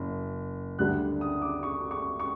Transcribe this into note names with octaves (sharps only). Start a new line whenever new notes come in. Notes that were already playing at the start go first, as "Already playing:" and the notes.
Already playing: F#1
D2 D3 G3 F#6
D#6
D6
C#6
C#6
C#6